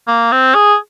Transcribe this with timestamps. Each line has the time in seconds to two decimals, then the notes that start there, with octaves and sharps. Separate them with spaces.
0.07 A#3
0.32 C4
0.54 G#4